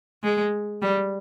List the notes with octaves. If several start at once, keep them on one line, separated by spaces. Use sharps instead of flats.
G#3
G3